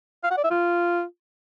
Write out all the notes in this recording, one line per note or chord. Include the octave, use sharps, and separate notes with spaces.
F5
F#5
D5
E5
F4